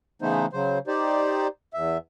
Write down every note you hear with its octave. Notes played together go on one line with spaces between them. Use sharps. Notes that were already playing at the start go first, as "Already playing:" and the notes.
C#3 E3 A3 B3 D#4 C5
C#3 F#3 C5
D#4 G4 C5 D5
E2 E5